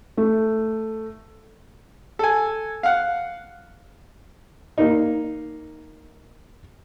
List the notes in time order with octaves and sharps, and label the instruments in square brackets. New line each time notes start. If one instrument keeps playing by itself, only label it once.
[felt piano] A3
[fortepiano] A4 G#5
F5 F#5
A#3 D#4